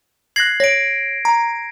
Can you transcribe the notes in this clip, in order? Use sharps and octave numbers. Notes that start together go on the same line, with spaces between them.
F#6 G#6 A#6 C7 F#7
C#5 A#6 D7
A#5